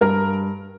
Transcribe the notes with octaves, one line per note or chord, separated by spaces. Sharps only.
G2 A#4